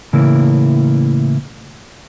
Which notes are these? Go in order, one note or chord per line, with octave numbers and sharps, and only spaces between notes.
A2 C#3 E3 A#3 E4